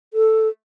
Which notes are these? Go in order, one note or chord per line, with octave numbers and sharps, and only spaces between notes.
A4